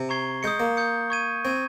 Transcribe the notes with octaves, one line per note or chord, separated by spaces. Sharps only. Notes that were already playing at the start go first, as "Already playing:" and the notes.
Already playing: C3
A#5 C#6 G#6 C7 G7
G#3 D#6 G6 C#7
A#3
D#6 G6 C#7
C#6 G#6 D#7
C4 C#6 G#6 D#7